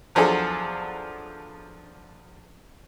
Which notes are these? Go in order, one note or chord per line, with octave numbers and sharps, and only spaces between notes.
E2 F3 F#3 D4 G#4 A4